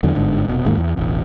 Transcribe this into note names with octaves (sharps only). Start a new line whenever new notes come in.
E2 D3 E3 F#3
G1 G#2 D3
F1 B2
E1 G#2 D#3 A#3
E2
E1 A1